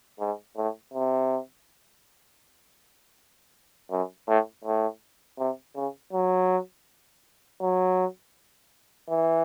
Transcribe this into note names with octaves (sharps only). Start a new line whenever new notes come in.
G#2
A2
C3
F#2
A2
A2
C3
C#3
F#3
F#3
E3